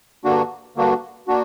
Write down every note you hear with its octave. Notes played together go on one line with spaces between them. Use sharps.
G2 D3 A#3 D4 F#4
G2 D3 A#3 D4 F#4
A#3 D4 F#4